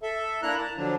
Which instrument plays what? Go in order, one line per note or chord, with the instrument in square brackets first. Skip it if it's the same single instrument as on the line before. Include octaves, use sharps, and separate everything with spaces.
[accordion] A4 E5
A#3 D4 E4 A#5 F#6
A5
D3 F3 F#3 D4